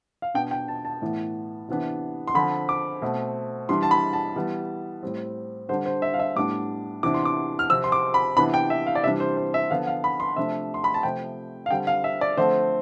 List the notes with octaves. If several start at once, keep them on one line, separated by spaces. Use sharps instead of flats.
F5
B2 B3 D4 G5
G5
A5
A5
A2 E3 B3
C3 E3 B3 D4
C6
D3 F3 C4 B5
D6
B2 A3 C4
E3 G3 D4 C6
A5
B5
A5
E3 G3 B3
A2 G3 C4
D3 G3 D4 C5
C5
E5
F5
E5
A2 G3 B3 D4 D6
C3 E3 B3 D4 D6
C6
D6
F6
C3 F3 C4 E6
C6
D6
B5
C3 E3 B3 D4 B5
G5
E5
F5
D5
C3 E3 G3 D4 E5
C5
C5
E5
D3 F3 B3 F5
F5
B5
C6
C3 F3 A3 D4 E5
C6
B5
A5
C3 F3 A3 G5
F5
D3 G3 C4 G5
F5
E5
D5
D3 F3 A3 C4 C5